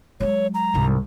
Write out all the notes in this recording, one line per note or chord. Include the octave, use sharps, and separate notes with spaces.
F#3 G#3 C#5
A#5
C2 G#2